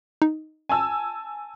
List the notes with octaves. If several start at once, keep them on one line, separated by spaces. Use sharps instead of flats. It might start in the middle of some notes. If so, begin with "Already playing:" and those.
D#4
G#5 A5 E6